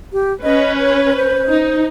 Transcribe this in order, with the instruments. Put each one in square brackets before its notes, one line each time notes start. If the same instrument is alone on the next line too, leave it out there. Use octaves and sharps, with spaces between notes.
[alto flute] G4
[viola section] C#4 B4 [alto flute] D#5
[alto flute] C#5
C5
[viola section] D#4